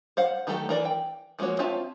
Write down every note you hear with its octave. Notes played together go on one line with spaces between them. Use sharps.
C5 F5 F#5
D#3 F#3 A3 G4 A4
E3 A#4 D5
G5
F3 G#3 A#3 F#4 C#5
C4 F4 C#5 E5 A5